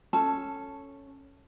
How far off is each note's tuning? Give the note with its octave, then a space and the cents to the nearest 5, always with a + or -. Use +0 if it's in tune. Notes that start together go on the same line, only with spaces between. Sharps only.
C#4 +0 A4 +0 A5 +0